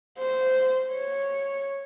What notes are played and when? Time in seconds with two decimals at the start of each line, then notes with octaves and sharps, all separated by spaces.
0.19 C5
0.93 C#5